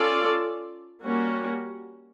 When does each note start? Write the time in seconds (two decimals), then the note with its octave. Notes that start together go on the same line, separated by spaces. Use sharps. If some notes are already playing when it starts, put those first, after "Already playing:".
Already playing: C#4 F4 A4 D5
1.04 G3 A#3 C#4 F#4